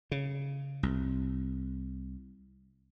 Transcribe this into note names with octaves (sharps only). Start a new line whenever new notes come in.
C#3
C2